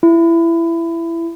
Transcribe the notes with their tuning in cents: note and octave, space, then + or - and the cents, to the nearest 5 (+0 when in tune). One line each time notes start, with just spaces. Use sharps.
E4 +20